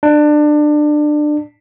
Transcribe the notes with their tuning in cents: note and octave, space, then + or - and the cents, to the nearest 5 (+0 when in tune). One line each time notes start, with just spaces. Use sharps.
D4 +25